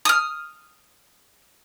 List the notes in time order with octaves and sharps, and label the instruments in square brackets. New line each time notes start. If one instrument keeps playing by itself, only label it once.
[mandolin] D#6 F6